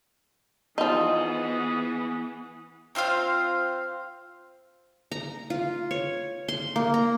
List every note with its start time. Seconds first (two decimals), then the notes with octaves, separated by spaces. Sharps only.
0.78 E3 F3 B3 D#4 G#4
2.95 C4 F4 C5 F5
5.11 A#5
5.50 F4
5.91 C#5
6.48 C6
6.76 A#3
6.94 A#5